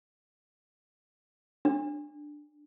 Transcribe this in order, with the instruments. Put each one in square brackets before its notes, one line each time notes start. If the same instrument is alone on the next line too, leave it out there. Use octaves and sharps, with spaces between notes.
[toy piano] D4